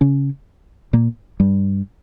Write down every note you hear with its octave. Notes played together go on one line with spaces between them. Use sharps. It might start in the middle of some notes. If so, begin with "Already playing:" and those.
C#3 C#4
A#2 A#3
G2 G3